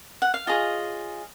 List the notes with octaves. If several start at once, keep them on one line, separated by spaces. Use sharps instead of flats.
F#5
F5
F4 G#4 C#5 D#5